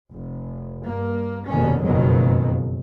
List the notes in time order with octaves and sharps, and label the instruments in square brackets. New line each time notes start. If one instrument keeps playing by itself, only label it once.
[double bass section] F1
G2 A#3
F1 D#2 B2 D3 D#3 C#4
F#1 F2 B2 D#3 F#3 G#3